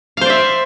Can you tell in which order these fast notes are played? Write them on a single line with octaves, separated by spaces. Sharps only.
F5 C5 D5 E5